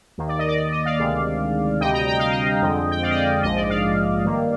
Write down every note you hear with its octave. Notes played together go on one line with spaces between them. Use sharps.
D#2 D#3 A#3
D5
D#5
D5
D5
D#5
D5 F5
D2 C3 D#3 G#3
D2 C3 G3 D#5 G5
G5 A#5
G5
F5
D#5 G5
F2 D3 G#3 C4
G5
D5 F5
D#5
D5
A#1 G#2 F3 G#3 D#5
D5
D#5
D5 F5
G2 D#3 A#3